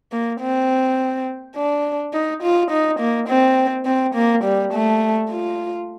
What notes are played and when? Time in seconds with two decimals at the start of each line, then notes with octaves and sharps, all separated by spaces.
0.12 A#3
0.40 C4
1.56 D4
2.13 D#4
2.43 F4
2.71 D#4
2.99 A#3
3.29 C4
3.86 C4
4.15 A#3
4.44 G3
4.73 A3
5.31 F4